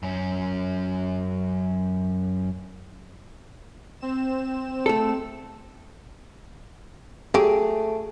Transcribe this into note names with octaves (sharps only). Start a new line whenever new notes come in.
F#2 C#4
C4 E7
A3 A4
F#3 A3 G4 G#4